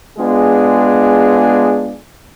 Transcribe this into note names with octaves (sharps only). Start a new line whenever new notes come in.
G#3 B3 D4 F4 G#4